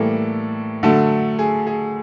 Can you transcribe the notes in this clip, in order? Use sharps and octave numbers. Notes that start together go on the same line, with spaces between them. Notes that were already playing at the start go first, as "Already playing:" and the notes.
Already playing: A2 E3 G3 A#3 A4
D3 F#3 A3 A4
G#4
G#4